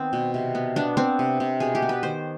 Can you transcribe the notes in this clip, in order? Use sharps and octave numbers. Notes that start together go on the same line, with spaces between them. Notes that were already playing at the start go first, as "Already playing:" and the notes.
Already playing: D#3 B3 C4
B2
C3
B3
B3 D4
B3 C4
C3
C3
B2 G#4
G4
B3
B4
D#3 C5